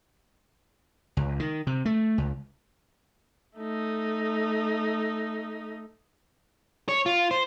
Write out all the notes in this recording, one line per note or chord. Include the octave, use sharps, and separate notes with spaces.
C#2
D#3
C3
A3
C#2
A3 D#4
C#5
F4
C5